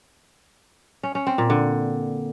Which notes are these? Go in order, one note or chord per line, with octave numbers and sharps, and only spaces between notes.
C#4
C#4
C4
A#2
D3